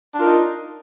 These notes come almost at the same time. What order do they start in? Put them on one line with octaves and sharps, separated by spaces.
D4 F4 A#4 D#4